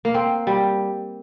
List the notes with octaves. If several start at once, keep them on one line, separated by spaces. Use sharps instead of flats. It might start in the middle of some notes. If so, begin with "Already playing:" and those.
A#3
C4
G3